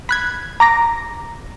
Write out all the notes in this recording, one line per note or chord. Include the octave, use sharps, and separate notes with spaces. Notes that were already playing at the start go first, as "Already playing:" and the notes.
B5 F#6 G#6
A#5 D6 A#6